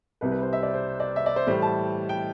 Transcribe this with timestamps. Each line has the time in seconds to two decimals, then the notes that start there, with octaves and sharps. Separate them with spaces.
0.21 C2 C3 G3 B4
0.32 B4
0.42 C5
0.53 E5
0.63 D5
0.74 C5
1.00 D5
1.16 E5
1.26 D5
1.36 C5
1.47 A2 E3 G3 C5
1.62 A5
2.09 G5